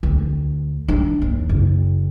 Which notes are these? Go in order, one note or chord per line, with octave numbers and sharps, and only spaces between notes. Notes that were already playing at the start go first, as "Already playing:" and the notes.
D2
D4
D#2
F#1